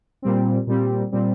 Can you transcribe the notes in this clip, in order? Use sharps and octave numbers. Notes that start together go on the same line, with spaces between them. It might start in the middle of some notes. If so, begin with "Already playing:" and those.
A#2 G3 C4
A#2 G3 C4
A#2 G3 C4